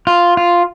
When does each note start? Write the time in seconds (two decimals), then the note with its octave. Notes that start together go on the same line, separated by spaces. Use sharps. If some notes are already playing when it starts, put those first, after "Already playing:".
0.07 F4
0.37 F4